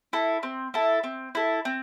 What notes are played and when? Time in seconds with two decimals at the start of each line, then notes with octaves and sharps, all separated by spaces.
0.13 E4 A4
0.43 C4
0.74 E4 A4
1.03 C4
1.35 E4 A4
1.65 C4